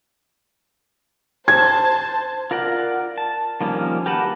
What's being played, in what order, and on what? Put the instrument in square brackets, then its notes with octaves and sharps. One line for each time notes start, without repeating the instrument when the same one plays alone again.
[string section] C5 A5 [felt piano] G#6
[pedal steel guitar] F4 A#4 D5 F#5
A5
D#3 F3 G3 A#3 C#4
G4 A#4 B4 F#5 A5